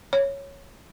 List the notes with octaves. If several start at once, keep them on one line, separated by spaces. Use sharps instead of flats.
C#5